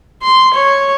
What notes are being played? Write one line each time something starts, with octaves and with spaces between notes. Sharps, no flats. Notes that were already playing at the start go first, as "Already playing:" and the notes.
C6
C#5